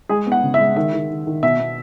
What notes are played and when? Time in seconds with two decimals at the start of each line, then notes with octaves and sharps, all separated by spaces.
0.09 G#3 G#4
0.27 B3
0.32 F#5
0.43 C#3
0.54 E5
0.59 G#3
0.76 D#3 E5
0.93 D#3
1.10 D#3
1.27 D#3
1.43 B2 E5
1.60 B3